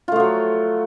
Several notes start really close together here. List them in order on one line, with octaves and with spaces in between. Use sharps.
F4 A3 F3 F#3